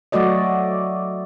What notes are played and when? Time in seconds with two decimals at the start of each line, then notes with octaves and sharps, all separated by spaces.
0.12 F#3 A3 F#4 D5 D#5